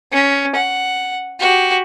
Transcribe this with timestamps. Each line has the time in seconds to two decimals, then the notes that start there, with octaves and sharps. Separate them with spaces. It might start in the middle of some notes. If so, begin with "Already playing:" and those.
0.13 C#4
0.56 F#5
1.40 F#4 G4